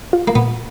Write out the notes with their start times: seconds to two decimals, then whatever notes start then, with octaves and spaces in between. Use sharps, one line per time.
0.13 F4
0.28 A#3
0.35 A#2 B3